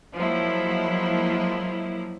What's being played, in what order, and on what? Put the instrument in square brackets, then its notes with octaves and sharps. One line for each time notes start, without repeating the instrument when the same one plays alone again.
[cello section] F3 F#3 G#3 A#3 E4